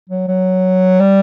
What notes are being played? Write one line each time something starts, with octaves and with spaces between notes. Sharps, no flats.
F#3
F#3
G3